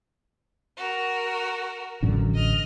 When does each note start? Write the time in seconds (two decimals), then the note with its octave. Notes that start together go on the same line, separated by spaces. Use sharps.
0.77 F#4 A#4
2.03 A1 F#2 D3
2.34 D#5 F6